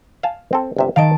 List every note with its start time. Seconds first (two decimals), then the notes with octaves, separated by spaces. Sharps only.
0.23 F5 G#5 A5
0.53 C4 A4
0.76 G1 C3 E5
0.96 D#3 D#5 F5 A5 D7